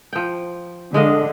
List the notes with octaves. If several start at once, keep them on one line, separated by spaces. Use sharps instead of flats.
F3 G5
D3 G#3 D#5 F5